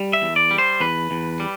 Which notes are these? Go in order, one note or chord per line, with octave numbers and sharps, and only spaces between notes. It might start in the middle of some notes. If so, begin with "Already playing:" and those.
Already playing: G3
E5
E2
D5
G3
C5
E2 B4
E2
G3